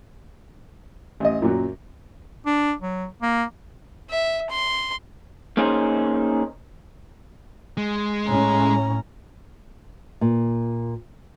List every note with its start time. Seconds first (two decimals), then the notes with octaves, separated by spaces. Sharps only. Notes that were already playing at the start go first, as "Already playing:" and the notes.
1.20 A1 D#5
1.42 F#2 A#2 F#3
2.46 D4
2.81 F#3
3.22 A#3
4.10 E5
4.50 C6
5.57 A#3 C#4 D#4 G#4 C5
7.77 G#3
8.29 A2 C#4 A#5
10.21 A#2